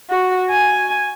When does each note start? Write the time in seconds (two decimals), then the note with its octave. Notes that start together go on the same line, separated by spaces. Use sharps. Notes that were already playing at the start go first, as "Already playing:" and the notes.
0.10 F#4
0.50 G#5